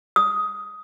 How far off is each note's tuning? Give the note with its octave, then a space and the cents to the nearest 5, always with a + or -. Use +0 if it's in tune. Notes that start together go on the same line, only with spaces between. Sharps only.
D#6 +10